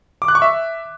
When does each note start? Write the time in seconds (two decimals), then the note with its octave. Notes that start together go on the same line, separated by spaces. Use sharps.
0.22 D6
0.28 F#6
0.35 C#6
0.42 E5